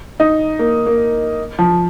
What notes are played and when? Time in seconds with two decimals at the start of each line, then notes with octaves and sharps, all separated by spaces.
0.20 D#4
0.59 A#3
0.86 A#3
1.59 F3